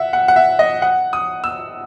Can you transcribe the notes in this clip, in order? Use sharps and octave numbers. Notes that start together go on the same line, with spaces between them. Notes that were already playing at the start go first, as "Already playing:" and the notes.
Already playing: E5 F#5
F#5
F#5
E5
D#5
F#5
D#6
E6